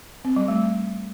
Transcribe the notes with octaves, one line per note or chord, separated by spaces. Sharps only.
C4
G3
A3